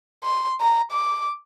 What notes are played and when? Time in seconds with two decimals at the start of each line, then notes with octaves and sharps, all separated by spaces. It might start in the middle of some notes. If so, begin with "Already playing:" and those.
0.24 C6
0.60 A#5
0.91 D6